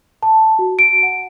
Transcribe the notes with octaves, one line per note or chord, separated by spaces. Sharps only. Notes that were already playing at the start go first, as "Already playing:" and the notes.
A5
F#4
D7
F#5